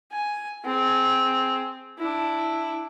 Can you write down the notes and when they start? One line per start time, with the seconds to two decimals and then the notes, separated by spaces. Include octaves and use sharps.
0.12 G#5
0.64 C4 G#4
1.98 D4 E4